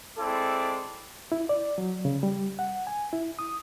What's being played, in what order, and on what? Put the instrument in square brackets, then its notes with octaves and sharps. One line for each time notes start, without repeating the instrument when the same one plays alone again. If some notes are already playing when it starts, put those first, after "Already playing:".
[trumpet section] G#3 C4 E4 A4 D5
[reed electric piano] E4
D5
F#3
C#3
G3
F#5
G#5
E4
D#6